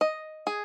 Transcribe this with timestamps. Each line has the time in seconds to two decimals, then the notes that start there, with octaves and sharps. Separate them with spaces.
0.01 D#5
0.47 G#4